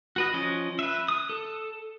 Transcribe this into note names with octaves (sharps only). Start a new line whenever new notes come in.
F#4 B4 D#5
F3 C#4 D#5
B4 E5
D#6
A4